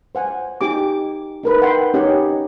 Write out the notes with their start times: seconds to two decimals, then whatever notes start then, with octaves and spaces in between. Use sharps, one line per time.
0.15 C5 F#5 G#5
0.61 D#4 G4 G#5 D6
1.43 D#4 A#4 B4
1.61 E5 F#5 G5 B5 C6
1.94 C#4 D#4 G4 C#5 F#5